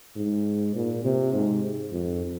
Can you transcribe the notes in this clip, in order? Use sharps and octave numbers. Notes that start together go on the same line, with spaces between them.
G#2
A#2
C3
G#2
F2